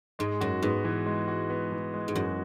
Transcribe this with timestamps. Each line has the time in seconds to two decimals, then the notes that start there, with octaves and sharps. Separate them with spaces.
0.19 G#2 G#3
0.41 F#2 F#4
0.62 G#2 B3
0.85 E3
1.06 G#3
1.28 F#4
1.50 B3
1.72 E3
1.94 G#3
2.08 G#2
2.15 F#2 F#4